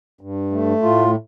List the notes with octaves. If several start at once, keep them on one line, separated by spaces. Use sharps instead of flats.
G2
A3
A2 F4